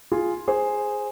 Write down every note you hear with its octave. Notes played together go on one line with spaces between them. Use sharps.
F4 G#4
G#4 C5